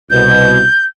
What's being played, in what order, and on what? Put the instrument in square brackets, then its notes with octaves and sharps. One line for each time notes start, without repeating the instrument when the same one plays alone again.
[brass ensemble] C2 B2 [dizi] G6